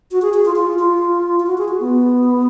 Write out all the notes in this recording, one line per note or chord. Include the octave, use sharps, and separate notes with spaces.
F#4
G#4
G#4
F4
F4
F4
F4
F#4
G#4
F#4
B3